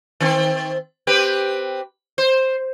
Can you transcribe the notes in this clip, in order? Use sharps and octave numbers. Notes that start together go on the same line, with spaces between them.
D#3 C4
C4 G4 B4
C5